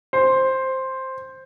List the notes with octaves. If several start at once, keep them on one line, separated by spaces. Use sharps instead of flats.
C5